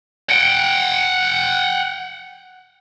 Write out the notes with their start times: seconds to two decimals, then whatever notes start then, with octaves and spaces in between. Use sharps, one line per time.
0.29 F#5 G5